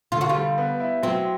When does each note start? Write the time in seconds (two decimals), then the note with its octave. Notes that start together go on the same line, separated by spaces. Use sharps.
0.12 D3 F4
0.21 F#4
0.29 F4
0.35 G3
0.58 B3
0.80 E4
1.03 F#3 C4